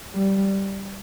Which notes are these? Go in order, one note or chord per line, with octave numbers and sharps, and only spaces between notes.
G3